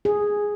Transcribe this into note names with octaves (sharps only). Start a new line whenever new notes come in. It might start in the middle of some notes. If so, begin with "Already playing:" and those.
G#4